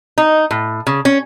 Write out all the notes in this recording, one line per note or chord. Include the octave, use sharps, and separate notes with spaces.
D#4
A2
C#3
C#4